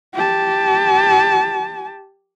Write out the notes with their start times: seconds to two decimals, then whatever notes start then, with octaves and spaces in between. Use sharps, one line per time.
0.15 G4 A5